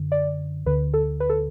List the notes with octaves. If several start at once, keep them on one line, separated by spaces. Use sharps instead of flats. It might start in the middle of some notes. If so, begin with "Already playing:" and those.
Already playing: F#2 D3
D5
D2 D3 B4
A4
B4
A4